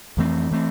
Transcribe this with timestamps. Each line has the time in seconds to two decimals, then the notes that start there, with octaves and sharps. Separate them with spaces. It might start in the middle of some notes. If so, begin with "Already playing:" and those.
0.17 F2 E3 A3 C4
0.51 E3 A3 C4